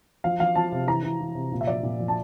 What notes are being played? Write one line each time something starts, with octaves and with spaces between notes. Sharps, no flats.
F3 F5
F3 F5
F3 A5
C3
E3 A#5
E3
E3
C3
A#2
E5
F3 D5
A#2
F3
A5